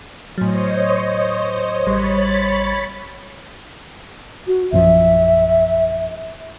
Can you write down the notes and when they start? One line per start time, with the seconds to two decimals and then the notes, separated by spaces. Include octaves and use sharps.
0.38 A2 F#3 C5 C#5 D#5
1.87 A1 G3 C#5 B5 C6 A6
4.47 F#4
4.72 A#1 F#2 F3 E5